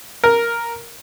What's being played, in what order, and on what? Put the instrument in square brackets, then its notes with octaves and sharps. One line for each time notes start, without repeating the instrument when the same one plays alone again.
[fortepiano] A#4